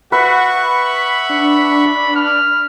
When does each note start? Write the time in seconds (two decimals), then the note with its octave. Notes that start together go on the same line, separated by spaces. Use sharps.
0.12 F#4 B4 E5 F#5 C#6
0.65 B5
1.30 D4
2.16 F6